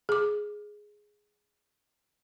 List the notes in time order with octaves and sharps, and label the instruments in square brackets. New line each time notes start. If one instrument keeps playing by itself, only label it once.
[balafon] G#4 D6